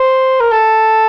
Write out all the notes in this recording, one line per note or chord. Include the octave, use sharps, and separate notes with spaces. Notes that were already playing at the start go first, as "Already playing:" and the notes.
Already playing: C5
A#4
A4